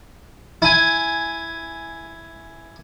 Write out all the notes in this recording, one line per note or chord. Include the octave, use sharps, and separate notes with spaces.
E4 G#5